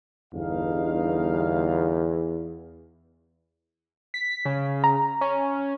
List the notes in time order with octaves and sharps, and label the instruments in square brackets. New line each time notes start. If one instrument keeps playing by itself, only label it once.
[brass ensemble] G1 D#4 F5 [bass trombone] E2
[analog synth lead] B6
C#3
[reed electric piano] A#5
[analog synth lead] C#4